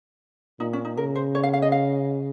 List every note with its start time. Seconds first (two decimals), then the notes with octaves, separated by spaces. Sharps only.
0.60 A#2 D#4
0.73 C#4
0.85 D#4
0.97 C#3 A#4
1.16 C5
1.35 C#5
1.43 F5
1.53 F5
1.62 D#5
1.72 F5